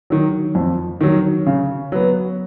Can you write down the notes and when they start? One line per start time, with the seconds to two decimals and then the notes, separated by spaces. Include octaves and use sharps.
0.10 D#3 F#3
0.55 F2
1.01 D#3 F#3
1.47 C#3
1.92 F#3 B3